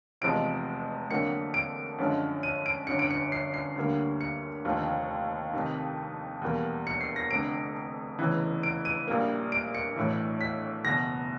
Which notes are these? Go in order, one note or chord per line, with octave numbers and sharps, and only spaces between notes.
F1 E2 C3 F3 G#3 D7
F2 D3 F#3 A#3 C#7
D7
F#2 D3 F3 G#3
D#7
D7
G1 F#2 D3 C#7
D7
C#7
C7
C7
D2 D3 G3 A#3
C#7
F1 D#2 D3 F3
F2 C3 D#3
E2 B2 G3 A#3
C#7
C7
A#6
F1 F2 D3 D7
F1 E2 C#3 E3
D7
D#7
A#1 A#2 G3 A#3
D7
C#7
B1 A2 E3
B6
F#1 E2 B2 A#6